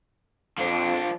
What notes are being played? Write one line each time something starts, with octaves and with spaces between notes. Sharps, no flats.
F2 F3 D4